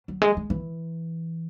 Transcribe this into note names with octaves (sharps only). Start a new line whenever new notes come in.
F#3
G#3
G#3
E3